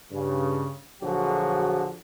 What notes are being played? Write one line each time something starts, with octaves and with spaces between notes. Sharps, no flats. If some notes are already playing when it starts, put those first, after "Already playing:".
G2 C#3
A#1 D3 F3 F#3 F#4 G#4